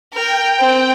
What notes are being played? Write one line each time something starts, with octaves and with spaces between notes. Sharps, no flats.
A#4 G5
C4